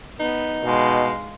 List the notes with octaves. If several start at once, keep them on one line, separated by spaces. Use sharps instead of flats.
B3 D#4
B2 G#3 F5